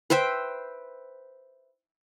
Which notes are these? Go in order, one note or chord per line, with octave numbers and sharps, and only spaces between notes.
B4 C5 E5 G5